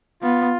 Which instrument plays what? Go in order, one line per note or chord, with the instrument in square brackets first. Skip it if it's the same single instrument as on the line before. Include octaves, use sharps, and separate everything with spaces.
[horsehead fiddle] B3 [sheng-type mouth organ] F4